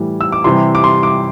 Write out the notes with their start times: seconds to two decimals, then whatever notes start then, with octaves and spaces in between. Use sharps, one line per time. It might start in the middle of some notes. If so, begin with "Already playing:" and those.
Already playing: A2 E3 G3
0.21 E6
0.32 D6
0.44 C3 E3 G3 C6
0.75 D6
0.84 C6
1.03 D6